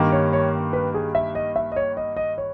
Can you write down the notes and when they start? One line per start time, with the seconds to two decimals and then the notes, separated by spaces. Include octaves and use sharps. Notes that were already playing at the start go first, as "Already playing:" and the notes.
Already playing: G2 D#3 A#3
0.12 C#5
0.33 C#5
0.73 B4
0.94 G#4
1.15 E5
1.35 D#5
1.56 E5
1.72 D#5
1.76 C#5
1.97 D#5
2.17 D#5
2.38 C#5